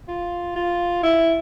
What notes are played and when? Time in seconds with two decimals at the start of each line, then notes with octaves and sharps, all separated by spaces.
0.08 F4
0.56 F4
1.03 E4